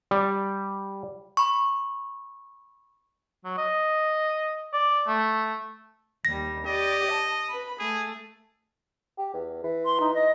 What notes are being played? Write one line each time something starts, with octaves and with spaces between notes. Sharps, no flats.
G3
B5 C#6
F#3
D#5
D5
A3
D#2 G3 A#6
G4 D5 D#5
A5
B4 B5
A3 G#4
G4
E2
E3
C6
D#4
D#5